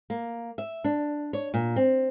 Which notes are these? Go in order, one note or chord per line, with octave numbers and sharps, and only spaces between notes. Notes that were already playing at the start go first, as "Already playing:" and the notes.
A#3
E5
D4
C#5
A#2
C4